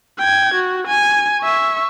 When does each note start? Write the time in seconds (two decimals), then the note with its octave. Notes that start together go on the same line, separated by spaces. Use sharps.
0.19 G5 G#6
0.55 F#4
0.88 G#5
1.42 E5 C#6